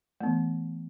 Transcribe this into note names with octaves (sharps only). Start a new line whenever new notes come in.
E3 A3 B3